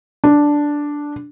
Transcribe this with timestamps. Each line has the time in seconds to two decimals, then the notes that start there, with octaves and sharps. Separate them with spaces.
0.24 D4